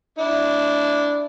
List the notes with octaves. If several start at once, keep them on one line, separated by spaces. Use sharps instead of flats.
D4 E4